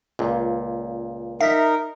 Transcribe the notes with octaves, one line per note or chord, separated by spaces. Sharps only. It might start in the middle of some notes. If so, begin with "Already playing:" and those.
C#2 A#2
D#4 A#4 E5